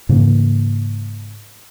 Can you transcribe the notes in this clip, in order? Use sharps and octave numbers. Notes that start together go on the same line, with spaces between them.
G#2 C#3 E3 A#3